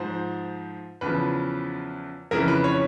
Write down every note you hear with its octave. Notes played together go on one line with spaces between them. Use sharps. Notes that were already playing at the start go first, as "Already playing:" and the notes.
Already playing: G#2 F3 C5
E2 C#3 F3 B4
F2 C#3 E3 A#4
B4
C#5